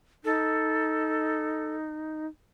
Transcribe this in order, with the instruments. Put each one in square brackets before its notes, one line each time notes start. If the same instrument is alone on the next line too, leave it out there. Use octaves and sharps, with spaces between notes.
[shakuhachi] D#4 [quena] A4